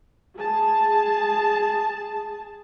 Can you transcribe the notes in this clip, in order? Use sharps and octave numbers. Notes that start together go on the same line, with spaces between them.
G#4 A5